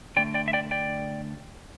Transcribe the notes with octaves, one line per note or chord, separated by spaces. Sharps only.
D3 A3 D5 G5
D5 G5
E5
D5 G5
D5 G5